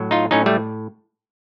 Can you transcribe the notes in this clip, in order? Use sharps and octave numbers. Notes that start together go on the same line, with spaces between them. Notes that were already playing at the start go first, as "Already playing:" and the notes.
Already playing: A2 F#3
D#4 F4
A2 F#3 C#4 D#4
G3 A3